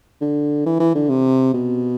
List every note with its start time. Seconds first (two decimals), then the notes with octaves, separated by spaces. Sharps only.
0.21 D3
0.66 E3
0.80 E3
0.95 D3
1.09 C3
1.54 B2